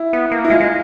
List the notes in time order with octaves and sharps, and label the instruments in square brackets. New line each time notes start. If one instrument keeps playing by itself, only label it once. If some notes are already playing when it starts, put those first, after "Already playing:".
Already playing: [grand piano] E4
[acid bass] B3
A#3
[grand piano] E4
[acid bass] G#3 [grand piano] F4
[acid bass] G#3